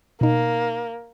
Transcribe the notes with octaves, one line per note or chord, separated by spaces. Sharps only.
B2 A#3 D#4